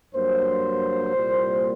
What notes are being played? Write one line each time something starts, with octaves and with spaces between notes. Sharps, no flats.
G2 F#3 A#3 C5
C2 A#2 G3 A#3